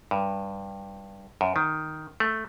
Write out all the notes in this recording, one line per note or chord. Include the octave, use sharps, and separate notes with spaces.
G2
F#2
D#3
A3